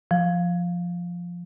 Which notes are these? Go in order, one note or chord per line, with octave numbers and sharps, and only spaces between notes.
F3